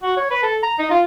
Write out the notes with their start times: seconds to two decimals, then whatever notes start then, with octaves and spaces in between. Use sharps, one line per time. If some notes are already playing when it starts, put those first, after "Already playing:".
0.03 F#4
0.17 C#5
0.31 B4
0.43 A4
0.63 A#5
0.79 D#4
0.91 F4